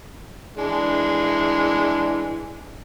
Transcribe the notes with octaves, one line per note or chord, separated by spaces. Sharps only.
E3 G#3 D4